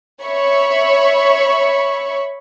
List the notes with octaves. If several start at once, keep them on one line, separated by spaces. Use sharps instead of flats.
C#5 E5 B5 C#6